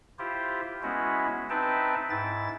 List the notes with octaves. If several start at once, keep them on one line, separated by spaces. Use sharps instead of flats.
E4 F4 G4 C5
G#3 B3 C#4 E4 F#4
C4 D#4 B4 E5 G5 A5
G#2 E4 A6